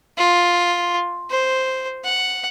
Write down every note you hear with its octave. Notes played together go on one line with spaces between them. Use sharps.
F4
C5
F#5